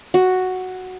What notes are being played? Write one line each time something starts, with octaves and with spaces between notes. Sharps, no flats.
F#4